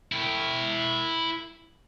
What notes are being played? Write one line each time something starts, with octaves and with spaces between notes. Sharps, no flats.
E4 G5